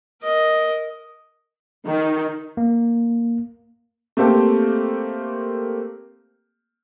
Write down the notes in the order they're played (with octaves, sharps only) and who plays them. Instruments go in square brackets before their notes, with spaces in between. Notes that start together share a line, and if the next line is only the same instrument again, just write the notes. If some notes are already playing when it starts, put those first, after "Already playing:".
[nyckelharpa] A#4 D#5
[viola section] D#3
[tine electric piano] A#3
[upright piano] A3 A#3 C4 G4 A4